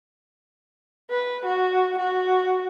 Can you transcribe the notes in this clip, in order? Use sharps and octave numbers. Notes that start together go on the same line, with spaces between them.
B4
F#4
F#4